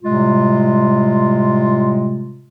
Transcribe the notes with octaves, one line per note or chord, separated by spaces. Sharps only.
A2 C3 G3 G#3 F4